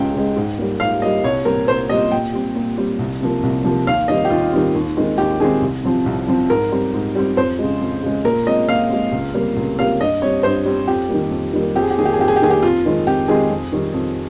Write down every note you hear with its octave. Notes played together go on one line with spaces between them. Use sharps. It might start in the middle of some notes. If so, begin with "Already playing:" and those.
Already playing: C#2 C#3 G#3 G5
C#3 G#3
G#2
G3 A#3
G#2 F5
G3 A#3 D#5
C2 C#5
A#2 G3 C4 A#4
C2 C5
A#2 G3 C4 D#5
A#2 G5
G3 C4
A#2
G3 C4
C2
C3 F3 A#3
C2
C3 F3 A#3
D#2 F5
D#3 G3 C4 D#5
G4
D#2 F4
D#3 G3 C4
D#2
D#3 G#3 C4
D#2 G4
D#3 G#3 C4 G#4
C2
C3 F3 C4
C2
C3 F3 C4
G#2 A#4
G3 C4
G#2
G3 C4
F2 C5
C#3 G#3
F2
C#3 G#3
A#2 A#4
G#3 C4 D#5
A#2 F5
G#3 C4
C#2
C3 G3 A#3
C#2
C3 G3 A#3 F5
G2 D#5
G3 C4 C#5
G2 C5
G3 C4
F2 G4
D#3 G3 A#3
F2
D#3 G3 A#3
F2 G4
G#4
G4
D#3 A#3 G#4
G4
G#4
F2 G4
G#4
G4
D#3 A#3 G#4
G4
F2 F4
D#3 G#3 C4
F2 G4
D#3 G#3 C4 G#4
F2
D#3 G3
F2